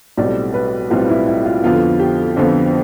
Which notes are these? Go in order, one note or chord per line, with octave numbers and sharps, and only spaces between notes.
B1 A2 G3 C4 D5
B4
B1 A2 G3 C4 F4
E4
E4
F4
F2 D3 F3 B3 F4
G4
F2 D3 F3 B3